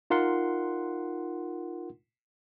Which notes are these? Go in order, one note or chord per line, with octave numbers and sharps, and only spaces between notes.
D#4 F4 A#4 F#5 C6